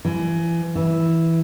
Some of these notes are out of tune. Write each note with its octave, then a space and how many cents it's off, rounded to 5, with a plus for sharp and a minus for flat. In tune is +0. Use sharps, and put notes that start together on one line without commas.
E3 +30
E3 -5